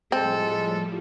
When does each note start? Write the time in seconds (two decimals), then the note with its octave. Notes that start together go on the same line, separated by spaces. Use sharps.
0.12 A2 F3 G3 G#3 C4 A4